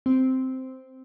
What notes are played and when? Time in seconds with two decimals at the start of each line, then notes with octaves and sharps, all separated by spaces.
0.06 C4